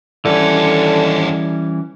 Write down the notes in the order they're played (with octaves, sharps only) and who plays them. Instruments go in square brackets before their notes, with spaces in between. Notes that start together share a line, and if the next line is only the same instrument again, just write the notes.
[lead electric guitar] D#2 A4 [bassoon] D3 [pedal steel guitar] E3 G3 C#4